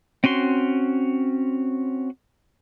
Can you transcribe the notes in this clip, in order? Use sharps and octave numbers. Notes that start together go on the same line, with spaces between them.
C4 C#4 F#4 C6